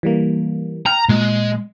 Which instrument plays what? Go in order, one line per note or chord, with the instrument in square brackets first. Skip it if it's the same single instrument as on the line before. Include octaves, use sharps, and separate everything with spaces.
[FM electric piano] E3 G3 A#3
[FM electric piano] G5 F6 [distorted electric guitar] A#5
[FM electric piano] A#2 [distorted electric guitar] G#3